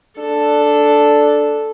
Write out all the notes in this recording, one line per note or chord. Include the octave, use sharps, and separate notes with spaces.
D4 A4